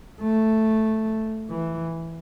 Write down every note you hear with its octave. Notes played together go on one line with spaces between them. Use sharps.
A3
E3